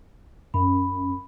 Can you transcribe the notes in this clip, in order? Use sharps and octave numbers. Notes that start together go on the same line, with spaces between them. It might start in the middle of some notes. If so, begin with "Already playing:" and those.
F#2 B5